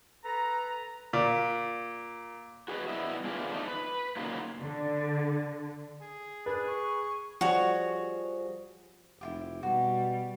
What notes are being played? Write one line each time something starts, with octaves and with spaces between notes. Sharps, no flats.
A4 B4 A#5
A#2
F#4 G#4 B4 D#5
G3 B3 E4 D#5 E5
D#3 A3 B3 D4 F4 G#4
A3 D4 D#4
B4
A#2 C#3 F#3 A#3 D#4 F4
D3
G#4
D4 G#4 B4
C#6
F3 G3 F#4 G#4 C#5
F1 E4 F4 G4
B2 G3 F#4